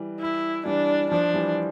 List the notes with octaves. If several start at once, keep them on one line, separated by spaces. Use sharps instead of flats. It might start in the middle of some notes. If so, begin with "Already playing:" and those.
Already playing: E3 G3
E4
E3 G3 D4
F3 D4
E3 G3